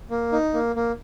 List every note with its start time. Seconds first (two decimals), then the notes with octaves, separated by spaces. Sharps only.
0.10 A#3
0.32 D#4
0.54 A#3
0.76 A#3